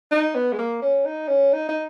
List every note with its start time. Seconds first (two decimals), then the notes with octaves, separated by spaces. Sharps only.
0.11 D#4
0.35 B3
0.53 G#3
0.58 A#3
0.82 C#4
1.05 D#4
1.28 C#4
1.53 D#4
1.69 D#4